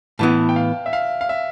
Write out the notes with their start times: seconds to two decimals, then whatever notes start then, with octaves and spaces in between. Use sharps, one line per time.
0.19 A2 E3 B3 E4 A5
0.49 G5
0.56 F5
0.86 E5
0.93 F5
1.21 F5
1.29 E5